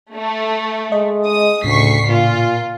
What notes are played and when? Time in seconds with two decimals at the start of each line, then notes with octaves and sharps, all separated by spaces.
0.15 A3
0.92 G#3 D#5
1.27 D#6
1.64 D2 A2 C#3 C#6 B6 C7
2.08 A#2 F4